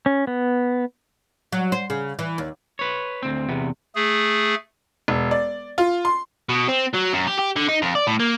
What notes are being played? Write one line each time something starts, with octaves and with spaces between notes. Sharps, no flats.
C#4
B3
F#3
C5
C#3
E3
D#2
B4 C#5
D2 C4
E2 C3 B3
A3 G#4
E1
D5
F4
C6
B2
C4
F#3
F#2
G4
G4
D3
D#4
F2
D5
A2
A#3